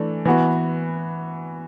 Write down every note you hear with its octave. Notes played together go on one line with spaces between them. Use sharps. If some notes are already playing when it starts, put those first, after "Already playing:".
Already playing: E3 A3 D4
E3 B3 F#4